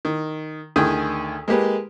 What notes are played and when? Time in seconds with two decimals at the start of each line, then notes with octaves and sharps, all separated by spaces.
0.05 D#3
0.76 D2 D#3 G#4 G5 G#5 D#6
1.48 G#3 A#3 G4 B4